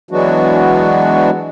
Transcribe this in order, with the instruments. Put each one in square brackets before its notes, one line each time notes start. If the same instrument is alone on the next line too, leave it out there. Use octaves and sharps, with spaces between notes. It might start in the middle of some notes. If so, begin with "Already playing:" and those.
[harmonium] E3 F#3 G#3 B3 D4 F#4